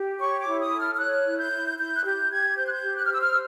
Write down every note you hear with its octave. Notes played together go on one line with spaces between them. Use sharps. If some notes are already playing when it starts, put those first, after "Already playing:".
Already playing: G4
C#5 C#6
D6
E4
D#6
A4
F6
F6
C#5 F#6
E4
G6
E4
E4 G6
F#6
G4 G6
G4 G#6
C5 G6
F#6
G6
G4
F#6
F6
C5 E6
F6
E6